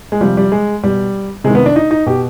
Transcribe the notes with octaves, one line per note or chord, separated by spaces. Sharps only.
G#3
C3 F3 G3
G3
G#3
B2 G3
C3 G#3
D#3
B3
D4
D#4
D#4
B2 G4